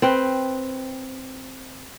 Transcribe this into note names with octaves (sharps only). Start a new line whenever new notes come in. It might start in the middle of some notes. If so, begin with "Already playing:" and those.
C4 B4 G5